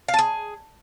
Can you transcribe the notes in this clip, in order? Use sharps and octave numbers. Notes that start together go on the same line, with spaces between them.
F5
A5
G#4